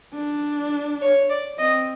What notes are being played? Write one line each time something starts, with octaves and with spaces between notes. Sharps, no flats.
D4
C#5
D5
C4 D#5